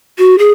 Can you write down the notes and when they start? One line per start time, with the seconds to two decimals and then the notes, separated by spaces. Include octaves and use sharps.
0.19 F#4
0.39 G#4